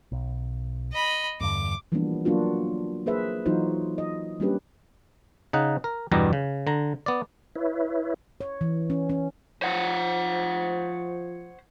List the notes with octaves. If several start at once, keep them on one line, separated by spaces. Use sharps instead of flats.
B1
D#5 B5
E2 G2 D3 D6
E3 F3 G3 A#3 B3 D4
F#3 A#3 B3 D4 F4 F#4
A#3 G#4 B4 C5 E5
E3 F#3 D#4 F4 F#4 C5
D#5
G3 A#3 C#4 D4 G4 B4
C#3 D#4 F#5
A#4
E2 G2 B2 G3 B3 A#5
C#3
D3 A#5
B3 D5
E4 B4 C#5 E5
C#5
E3
C#4
C#4
F3 C5 C#5 F#5